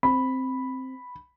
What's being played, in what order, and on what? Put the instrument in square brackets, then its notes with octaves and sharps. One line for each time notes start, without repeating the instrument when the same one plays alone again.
[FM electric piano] C4 [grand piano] B5